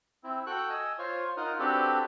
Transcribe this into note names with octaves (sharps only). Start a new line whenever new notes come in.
C4 E4
F#4 A4 G5 C#6 F#6
D#5 G#5 E6
F4 C5 C#5
D#4 F4 A#4 F#5
C4 D4 F#4 G4 A4 B4